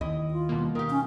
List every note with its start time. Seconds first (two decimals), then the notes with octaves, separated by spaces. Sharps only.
0.01 D#2 D#3 E4 D#5
0.31 F4
0.49 B2 G3 A#3
0.75 D#3 G4 A#4 F5
0.90 C#4